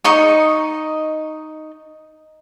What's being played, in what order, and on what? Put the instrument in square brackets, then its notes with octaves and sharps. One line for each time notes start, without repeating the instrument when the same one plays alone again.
[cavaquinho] D#4 D#5 C#6